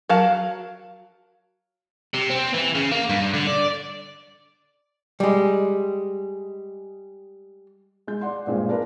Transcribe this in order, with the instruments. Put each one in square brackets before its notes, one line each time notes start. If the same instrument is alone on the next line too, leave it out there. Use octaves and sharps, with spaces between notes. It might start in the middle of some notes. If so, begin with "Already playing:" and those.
[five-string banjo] F#3 A#4 F5 A5
[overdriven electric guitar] C3
C4
E3
C#3
A#3
G2
D3
D5
[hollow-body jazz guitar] G3 G#3
[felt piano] G#3 G6
D5 F#5 C6
G2 A#2 G#3 C4
D4 A#4 B4